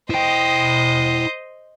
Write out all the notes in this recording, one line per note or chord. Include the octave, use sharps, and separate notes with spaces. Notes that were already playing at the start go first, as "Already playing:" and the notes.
E4 C5 D#5 G5